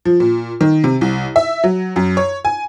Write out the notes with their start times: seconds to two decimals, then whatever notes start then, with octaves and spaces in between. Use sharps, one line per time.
0.05 F3
0.20 A#2
0.61 D#3
0.84 C3
1.01 C2
1.36 E5
1.64 F#3
1.96 F#2
2.17 C#5
2.45 G#5